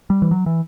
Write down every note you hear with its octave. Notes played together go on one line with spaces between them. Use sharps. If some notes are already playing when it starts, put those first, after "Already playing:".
G3
E3
F#3
E3